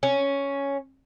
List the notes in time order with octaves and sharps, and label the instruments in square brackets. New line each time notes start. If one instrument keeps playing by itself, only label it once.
[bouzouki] C#4